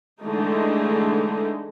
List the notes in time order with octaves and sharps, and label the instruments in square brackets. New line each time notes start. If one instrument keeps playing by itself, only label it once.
[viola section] D3 E3 G#3 A3 D#4